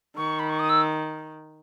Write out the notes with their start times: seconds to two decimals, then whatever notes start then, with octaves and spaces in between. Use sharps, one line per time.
0.16 D#3 C#6
0.39 B5
0.49 C#6
0.59 D#6
0.69 E6